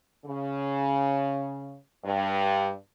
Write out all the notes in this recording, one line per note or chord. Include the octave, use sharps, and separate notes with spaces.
C#3
G2